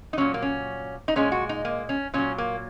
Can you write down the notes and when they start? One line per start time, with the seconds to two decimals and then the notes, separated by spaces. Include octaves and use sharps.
0.13 D#4
0.17 A#2 F#3 C#4
0.34 A#3
0.42 C#4
1.08 D#4
1.16 A#2 G#3 C#4
1.32 F#4
1.49 D#4
1.65 A#3
1.89 C#4
2.14 A#2 F#3 C#4
2.38 A#3